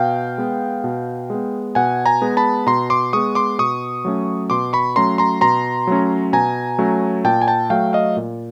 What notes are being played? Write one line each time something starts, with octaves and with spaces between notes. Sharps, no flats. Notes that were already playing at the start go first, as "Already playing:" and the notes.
Already playing: B2 F5 G5
G#3 B3
B2
G#3 B3
B2 F#5 G#5
G#5 A#5
G#3 B3
A5 B5
B2 A#5 C6
C6 D6
G#3 B3 C#6 D#6
C6 D6
B2 C#6 D#6
F#3 A3 C#4
B2 C6 D6
B5 C#6
F#3 A3 C#4 A#5 C6
A#5 C6
B2 A#5 C6
F#3 A3 C#4
B2 G#5 A#5
F#3 A3 C#4
A#2 G5 A5
G#5
G5 A5
F#3 A3 F5 G5
D#5 F5
A#2